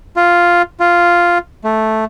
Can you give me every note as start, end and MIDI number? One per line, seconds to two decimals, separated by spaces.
0.16 0.62 65
0.80 1.38 65
1.64 2.05 57